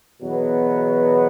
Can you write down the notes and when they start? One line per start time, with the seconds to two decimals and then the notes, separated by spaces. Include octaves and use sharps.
0.21 E2 B2 F#3 B3